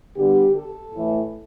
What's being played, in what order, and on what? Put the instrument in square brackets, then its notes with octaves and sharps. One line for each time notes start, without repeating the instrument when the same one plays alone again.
[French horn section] D3 G3 B3 G4
A4
A2 E3 A3